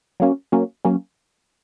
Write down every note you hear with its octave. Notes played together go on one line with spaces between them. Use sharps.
F#3 A#3 C#4
F#3 A#3 C#4
F#3 A#3 C#4